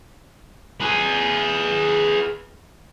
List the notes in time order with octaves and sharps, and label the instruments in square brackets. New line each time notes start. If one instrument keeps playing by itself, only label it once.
[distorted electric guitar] G#4 B4